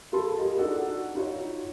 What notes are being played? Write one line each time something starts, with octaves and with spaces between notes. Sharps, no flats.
F4 G#4 A4 A5 C6
F4 G4 G#4 A#4 D#5
D4 D#4 F#4 A4 D5 F#5
D#4 F4 F#4 C#5